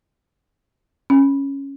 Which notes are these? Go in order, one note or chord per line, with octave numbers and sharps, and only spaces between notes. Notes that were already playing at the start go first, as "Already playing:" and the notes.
C#4